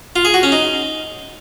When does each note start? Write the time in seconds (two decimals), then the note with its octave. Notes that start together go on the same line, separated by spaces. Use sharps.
0.16 F4
0.25 G#4
0.34 F#4
0.43 C#4
0.52 D#4